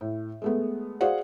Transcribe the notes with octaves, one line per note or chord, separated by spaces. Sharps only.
A2
G#3 A3 B3
F#4 G#4 C5 D5 F5 F#5